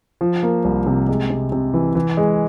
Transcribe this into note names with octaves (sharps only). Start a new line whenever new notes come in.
F3
A#3
C2
C3
G#3
C3
C3
E3
E3
G#3